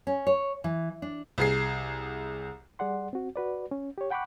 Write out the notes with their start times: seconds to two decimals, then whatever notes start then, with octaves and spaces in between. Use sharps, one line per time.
0.07 C#4
0.27 C#5
0.64 E3
1.02 D4
1.38 C2 G#4 C7
2.79 G3 G#4 D5 F#5 C6
3.13 C4 F#4
3.36 F#4 B4 D5
3.71 C#4
3.98 G4 C#5
4.10 F#5 G5 B5 C#6 D6 F#6